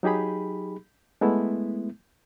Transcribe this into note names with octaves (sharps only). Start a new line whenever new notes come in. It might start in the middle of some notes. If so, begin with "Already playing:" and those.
F#3 D#4 G4 G#4 B5
G#3 A3 B3 E4